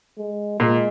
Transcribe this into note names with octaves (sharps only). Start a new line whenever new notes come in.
G#3
A#2 G#3